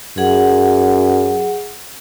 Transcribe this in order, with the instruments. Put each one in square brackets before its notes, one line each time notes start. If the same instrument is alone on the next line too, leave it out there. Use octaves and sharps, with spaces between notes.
[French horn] F#2 [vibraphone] G#4 F#5